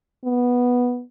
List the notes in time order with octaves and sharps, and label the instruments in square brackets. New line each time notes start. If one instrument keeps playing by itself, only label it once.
[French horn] B3